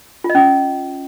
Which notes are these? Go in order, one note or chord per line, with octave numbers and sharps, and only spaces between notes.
F4
D#5
C#4